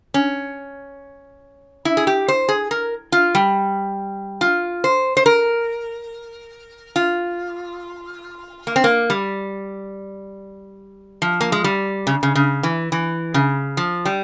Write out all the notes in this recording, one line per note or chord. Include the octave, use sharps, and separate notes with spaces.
C#4
E4
G#4
G4
C5
G#4
A#4
F4
G3
F4
C5
C5
A#4
F4
A#3
C4
A#3
G3
F3
A#3
G#3
G3
C#3
C#3
C#3
E3
E3
C#3
F3
G3